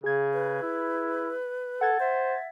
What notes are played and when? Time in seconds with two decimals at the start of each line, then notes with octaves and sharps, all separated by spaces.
0.04 C#3 G#4 G#6
0.33 B4
0.62 E4
1.81 A4 F#5 G#6 A6
2.00 C5 E5